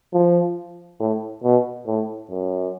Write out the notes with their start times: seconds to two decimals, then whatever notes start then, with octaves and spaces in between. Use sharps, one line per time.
0.13 F3
1.00 A2
1.44 B2
1.87 A2
2.30 F#2